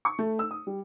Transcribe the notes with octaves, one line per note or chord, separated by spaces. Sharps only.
C#6
A3
E6
D#6
G3